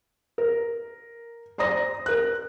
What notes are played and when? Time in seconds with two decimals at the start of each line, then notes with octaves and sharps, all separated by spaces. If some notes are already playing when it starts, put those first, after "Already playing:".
0.38 A#4
1.58 C5 D5 A#5 D#6 A#6
2.06 A#4 F#6